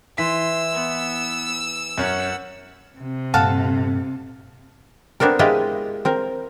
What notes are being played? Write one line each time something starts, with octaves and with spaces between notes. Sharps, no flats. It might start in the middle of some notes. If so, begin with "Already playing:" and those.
E3 C6 E6 B6
B3
F#2 C#4 F#5
C3
G2 A#2 A4 F5 F#5 A5
B3 C4 D4 A4 A#4
G#3 E4 F4 G4 D#5 E5
C4 A#4